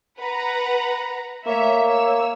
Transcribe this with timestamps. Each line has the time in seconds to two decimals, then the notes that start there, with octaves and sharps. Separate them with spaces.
0.19 B4 F#5 A#5
1.46 A3 A#3 C#5 E5
1.86 C#5 E6